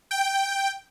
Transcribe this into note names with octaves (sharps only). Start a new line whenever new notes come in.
G5